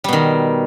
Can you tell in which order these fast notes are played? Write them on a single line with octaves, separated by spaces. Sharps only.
G3 B2 D#3